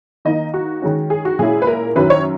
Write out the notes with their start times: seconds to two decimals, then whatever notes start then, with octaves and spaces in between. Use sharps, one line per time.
0.25 D#3 A#3 D#4 D#5
0.54 F#4
0.82 D#3 G#3 C#4
1.10 G#4
1.25 F#4
1.39 A#2 G#3 C#4 E4 G#4
1.62 B4
1.67 A#4
1.96 F#2 D#3 F#3 C#4 B4
2.10 C#5